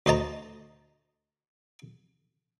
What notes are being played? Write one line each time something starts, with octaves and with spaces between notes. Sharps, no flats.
D2 C5 D#5 A5 A#5